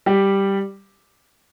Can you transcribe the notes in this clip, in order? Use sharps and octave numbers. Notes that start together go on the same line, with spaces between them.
G3 G4